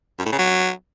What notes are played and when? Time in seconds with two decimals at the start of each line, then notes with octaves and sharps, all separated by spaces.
0.19 F#2
0.26 A2
0.32 C#3
0.39 F#3